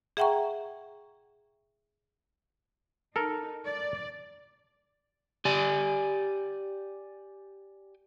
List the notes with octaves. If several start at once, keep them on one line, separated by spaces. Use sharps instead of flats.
G#4 E5 F#5 G5 A#5 C#6
D#4 A4 A#4
D5
G4 D5 G#5